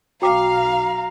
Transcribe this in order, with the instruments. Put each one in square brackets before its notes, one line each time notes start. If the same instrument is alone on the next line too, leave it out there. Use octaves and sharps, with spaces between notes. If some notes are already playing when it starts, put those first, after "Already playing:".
[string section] B1 F5 [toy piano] F#4 G5 D6 [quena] A#5